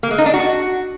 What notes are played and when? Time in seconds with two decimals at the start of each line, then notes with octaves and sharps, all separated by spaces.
0.03 A#3
0.11 G#3
0.18 D#4
0.26 D4
0.34 F#4